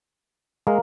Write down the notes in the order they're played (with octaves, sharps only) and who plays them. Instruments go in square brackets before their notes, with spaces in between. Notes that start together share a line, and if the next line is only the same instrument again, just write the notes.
[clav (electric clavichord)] G#3 [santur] A#3